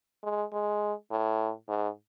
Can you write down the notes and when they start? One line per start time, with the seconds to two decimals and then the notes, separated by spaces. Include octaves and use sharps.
0.24 G#3
0.53 G#3
1.11 A2
1.68 G#2